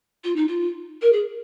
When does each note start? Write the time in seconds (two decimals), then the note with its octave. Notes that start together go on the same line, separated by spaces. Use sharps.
0.24 F4
0.36 D#4
0.47 F4
1.01 A#4
1.12 G#4